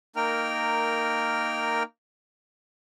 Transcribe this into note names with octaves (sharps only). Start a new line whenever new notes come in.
A#3 D#4 A#4 G5 F6